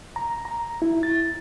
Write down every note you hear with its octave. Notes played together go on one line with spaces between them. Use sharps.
A#5
A#5
E4
A6